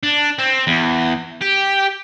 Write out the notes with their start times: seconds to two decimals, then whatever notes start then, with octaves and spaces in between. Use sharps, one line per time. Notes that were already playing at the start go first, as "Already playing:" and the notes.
0.03 D4
0.39 C4
0.67 E2
1.42 G4